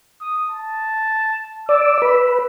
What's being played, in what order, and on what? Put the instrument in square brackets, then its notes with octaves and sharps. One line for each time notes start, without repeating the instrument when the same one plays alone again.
[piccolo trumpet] D#6
A5
[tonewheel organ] D5 [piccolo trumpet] E6
[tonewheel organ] B4